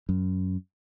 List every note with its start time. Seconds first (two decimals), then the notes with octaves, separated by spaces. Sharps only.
0.09 F#2